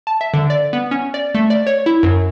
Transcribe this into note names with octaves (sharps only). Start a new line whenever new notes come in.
A5
E5
D3
D5
B3
C#4
D5
A3
D5
C#5
E4
F#2